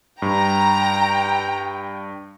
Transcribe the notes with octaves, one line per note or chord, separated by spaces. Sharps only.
G2 G5 A#5